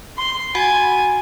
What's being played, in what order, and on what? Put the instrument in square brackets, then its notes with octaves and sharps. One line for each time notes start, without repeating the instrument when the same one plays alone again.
[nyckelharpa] C6
[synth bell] F#4 F#5 [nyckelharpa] G#5